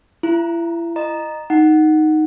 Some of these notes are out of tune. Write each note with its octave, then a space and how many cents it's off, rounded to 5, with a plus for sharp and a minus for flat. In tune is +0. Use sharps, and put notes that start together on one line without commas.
E4 +35 A#5 +0
D#5 -20 A#5 +0
D#4 +0 F#5 +0